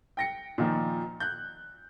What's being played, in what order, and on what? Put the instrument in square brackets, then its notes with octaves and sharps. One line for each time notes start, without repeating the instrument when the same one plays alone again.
[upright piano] G5 A#6 C#7
A#2 D#3 F3
F#6 G6